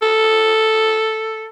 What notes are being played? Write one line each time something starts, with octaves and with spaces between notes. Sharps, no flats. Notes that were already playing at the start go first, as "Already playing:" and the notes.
A4